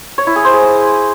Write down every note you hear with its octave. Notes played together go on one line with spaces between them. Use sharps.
C#5
E4
G#4
C5
G#4